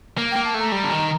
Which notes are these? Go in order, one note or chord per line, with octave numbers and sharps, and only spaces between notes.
A#3
G5
A#3
A5
A3 A#5
G3
D3
D#3